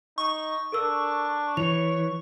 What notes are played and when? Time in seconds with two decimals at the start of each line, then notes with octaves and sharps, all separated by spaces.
0.18 D#4 C#6
0.72 D4 A4 A#4 E6
1.57 E3 C#5 F7